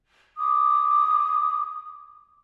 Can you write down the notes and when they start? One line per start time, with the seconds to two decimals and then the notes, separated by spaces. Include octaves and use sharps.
0.37 D6 D#6